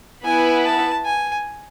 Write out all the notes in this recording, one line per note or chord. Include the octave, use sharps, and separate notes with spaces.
B3 E4 B4 G#5
A5
G#5